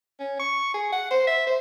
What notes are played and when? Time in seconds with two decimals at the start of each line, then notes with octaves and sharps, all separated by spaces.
0.20 C#4
0.40 C#6
0.74 G#4
0.92 F#5
1.11 C5
1.27 E5
1.47 C5